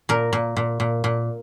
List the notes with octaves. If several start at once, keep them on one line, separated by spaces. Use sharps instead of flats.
A#2 A#4
A#2
A#2
A#2
A#2